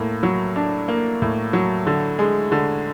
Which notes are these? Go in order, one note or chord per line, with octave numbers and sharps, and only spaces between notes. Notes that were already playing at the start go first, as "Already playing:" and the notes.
Already playing: A2 A#3
F#3
D4
A#3
A2
F#3
D3
G#3
D3